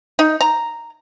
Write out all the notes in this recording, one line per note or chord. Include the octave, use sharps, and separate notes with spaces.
D#4
A#5